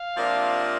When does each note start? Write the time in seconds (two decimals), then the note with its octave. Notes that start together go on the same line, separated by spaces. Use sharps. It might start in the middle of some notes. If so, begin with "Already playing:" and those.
Already playing: F5
0.17 C3 F3 A#3 D4 F4